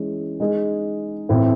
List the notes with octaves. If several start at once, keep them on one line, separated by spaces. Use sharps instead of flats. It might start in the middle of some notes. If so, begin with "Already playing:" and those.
Already playing: E3 G#3 C#4 G#4
G#3 D#4 G#4
A2 E3 A3 C4 E4